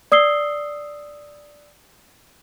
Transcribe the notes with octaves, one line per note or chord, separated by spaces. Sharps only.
D5 D#6 E6 C7 G7